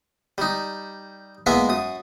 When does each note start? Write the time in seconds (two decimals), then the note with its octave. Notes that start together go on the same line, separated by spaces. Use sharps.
0.38 G3 D#4
1.46 G#3 A#3 B3 E4 E5 G#5
1.69 F#2 D#6